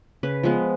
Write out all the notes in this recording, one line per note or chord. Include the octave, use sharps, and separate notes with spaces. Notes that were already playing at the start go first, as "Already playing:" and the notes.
C#3 B4
F3 G#3 B3